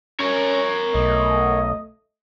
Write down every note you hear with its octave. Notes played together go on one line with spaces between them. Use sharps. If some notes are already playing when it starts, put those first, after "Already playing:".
C#4 A#4 C#5
B1 A3 D#5